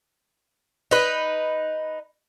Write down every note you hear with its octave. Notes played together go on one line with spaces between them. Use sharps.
D#4 B4